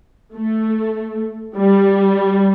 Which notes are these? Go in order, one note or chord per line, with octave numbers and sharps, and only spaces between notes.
A3
G3